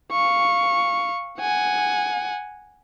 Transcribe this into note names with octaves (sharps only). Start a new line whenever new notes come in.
F5 C#6
F#5 G#5